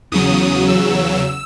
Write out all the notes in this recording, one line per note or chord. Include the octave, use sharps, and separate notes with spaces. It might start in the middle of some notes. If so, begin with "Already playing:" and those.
E2 C#3 F#3 D#6
E6